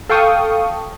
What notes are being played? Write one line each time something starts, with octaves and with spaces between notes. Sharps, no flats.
A4 F5 G5 C#6 D#6